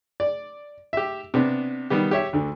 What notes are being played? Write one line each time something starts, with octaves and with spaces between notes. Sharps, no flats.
D5
G4 E5
C3 B3 D4
D#3 G3 B3 G4
G4 C#5 E5
D2 D3